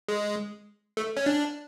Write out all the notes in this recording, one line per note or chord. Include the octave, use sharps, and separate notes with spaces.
G#3
A3
C#4
D4